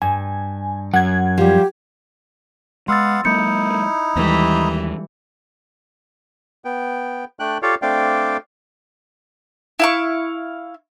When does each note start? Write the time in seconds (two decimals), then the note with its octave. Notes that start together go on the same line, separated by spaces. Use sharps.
0.02 G2 G#5
0.94 F#2 F#5 G#6
1.38 F3 G3 G4
2.88 G#3 B3 F5 F#5 C6 E6 A6
3.25 F#3 G#3 A#3 D#4 E4 G6 C#7
4.16 D#2 E3 G3 G#3
6.65 B3 G5
7.40 A3 D4 G5 F#6
7.62 F4 G4 A4 C#5 D5 F5
7.82 A3 C4 D4 D5 F5 G5
9.79 E4 F5 C#6